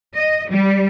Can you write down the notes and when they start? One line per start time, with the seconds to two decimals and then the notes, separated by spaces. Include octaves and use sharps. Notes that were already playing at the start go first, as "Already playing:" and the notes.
0.16 D#5
0.50 G3